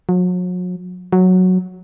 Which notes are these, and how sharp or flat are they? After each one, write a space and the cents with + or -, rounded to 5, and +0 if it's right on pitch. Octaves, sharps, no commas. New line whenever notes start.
F#3 -40
F#3 -5